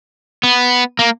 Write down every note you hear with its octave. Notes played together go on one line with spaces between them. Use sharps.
B3
A#3